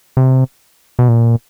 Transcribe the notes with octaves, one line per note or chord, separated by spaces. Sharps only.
C3
B2
A#2